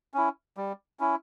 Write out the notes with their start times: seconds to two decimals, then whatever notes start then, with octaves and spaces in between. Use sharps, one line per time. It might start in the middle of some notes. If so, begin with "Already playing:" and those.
0.14 C#4 E4
0.57 G3
1.00 C#4 E4